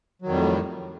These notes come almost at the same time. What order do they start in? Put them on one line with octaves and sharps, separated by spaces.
F#3 D#3 F2 G3 A2